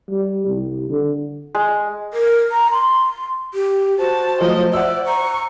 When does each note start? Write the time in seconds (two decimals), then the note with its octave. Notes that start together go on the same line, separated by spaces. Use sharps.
0.11 G3
0.47 C2
0.90 D3
1.55 G#3
2.13 A#4
2.51 A#5
2.72 C6
3.54 G4
3.99 F#4 C5 A5
4.41 F3 F#3 A3 D#5
4.74 D5 E5 F#5 E6
5.07 A#5 C#6